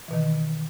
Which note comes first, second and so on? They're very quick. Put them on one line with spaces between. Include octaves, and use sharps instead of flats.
E3 B2 D#3